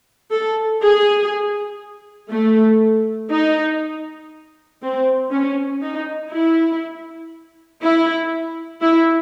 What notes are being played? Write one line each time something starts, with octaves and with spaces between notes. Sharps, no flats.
A4
G#4
A3
D#4
C4
C#4
D#4
E4
E4
E4